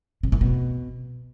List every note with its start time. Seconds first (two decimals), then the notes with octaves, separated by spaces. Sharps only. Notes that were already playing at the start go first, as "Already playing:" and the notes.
0.23 C3
0.32 A2
0.41 B2